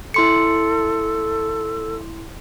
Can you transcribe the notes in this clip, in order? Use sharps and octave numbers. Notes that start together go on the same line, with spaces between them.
E4 A4 C6 C#7